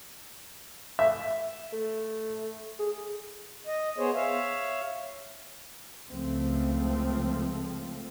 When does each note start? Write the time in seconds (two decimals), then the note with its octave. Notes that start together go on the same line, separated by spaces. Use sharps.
0.99 E5
1.73 A3
2.79 G#4
3.67 D#5
3.98 B3 G#4 C5 C#5
4.14 C#5 E5 F5
6.08 C#2 F3 A3 C4